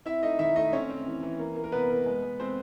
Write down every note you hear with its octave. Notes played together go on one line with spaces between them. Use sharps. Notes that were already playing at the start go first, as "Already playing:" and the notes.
C4 E4 E5
A3 D#4 D#5
D#3 E4 E5
A3 D#4 D#5
C4 C#4 C#5
C4
E3
E3
A#3
A#3
A#4
C3 B3 B4
A#3
G#3
G#3
G#3 C4 C5